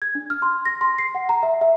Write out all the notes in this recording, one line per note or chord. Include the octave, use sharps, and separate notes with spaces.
G#6
D4
F6
C6
A#6
C6
C7
F#5
A#5
E5
E5